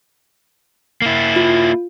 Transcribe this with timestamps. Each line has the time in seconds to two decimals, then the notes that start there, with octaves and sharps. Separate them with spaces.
1.02 A#3 E4
1.36 F4